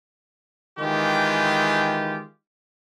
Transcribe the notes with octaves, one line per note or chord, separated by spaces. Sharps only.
D#3 E3 G#3 F4 G4